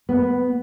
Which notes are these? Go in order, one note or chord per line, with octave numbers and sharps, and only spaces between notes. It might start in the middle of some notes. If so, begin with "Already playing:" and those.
B3